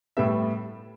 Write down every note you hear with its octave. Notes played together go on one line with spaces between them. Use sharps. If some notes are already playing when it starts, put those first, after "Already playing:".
A2 G3 B3 E5